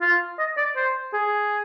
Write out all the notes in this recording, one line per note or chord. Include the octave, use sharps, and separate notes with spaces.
F4
D#5
D5
C5
G#4